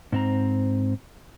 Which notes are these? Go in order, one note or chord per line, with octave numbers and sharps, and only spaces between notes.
G#2 C4 A#5